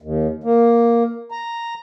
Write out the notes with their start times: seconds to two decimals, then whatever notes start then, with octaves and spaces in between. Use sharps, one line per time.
0.02 D#2
0.44 A#3
1.31 A#5